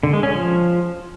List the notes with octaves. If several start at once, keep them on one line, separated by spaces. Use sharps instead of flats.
D3
G#3
C#4
F3